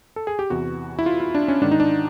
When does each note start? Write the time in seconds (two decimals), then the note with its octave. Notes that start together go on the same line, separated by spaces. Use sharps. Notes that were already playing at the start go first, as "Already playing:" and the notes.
0.16 A4
0.27 G#4
0.39 G4
0.50 E2 C3 E3 F#4
0.99 E4
1.06 F4
1.20 F4
1.35 D4
1.48 C#4
1.61 G#2 D#3 D4
1.71 D#4
1.80 D4